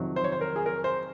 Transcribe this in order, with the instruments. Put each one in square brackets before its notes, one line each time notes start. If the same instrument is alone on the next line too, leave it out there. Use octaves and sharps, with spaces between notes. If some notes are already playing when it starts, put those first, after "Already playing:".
Already playing: [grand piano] F2 C3 D#3 F#3
C5
C#5
C5
A#4
G#4
A#4
C5